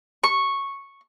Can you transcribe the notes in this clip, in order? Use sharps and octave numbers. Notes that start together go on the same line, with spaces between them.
C#6